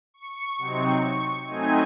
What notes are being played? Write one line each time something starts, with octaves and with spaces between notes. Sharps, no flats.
C#6
C3 F#3 C4 D#4
F#3 A3 C4 D#4 G#5